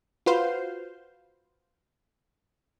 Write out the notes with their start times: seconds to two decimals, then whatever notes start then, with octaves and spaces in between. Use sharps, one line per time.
0.26 F4 F#4 B4 C5 F5 C6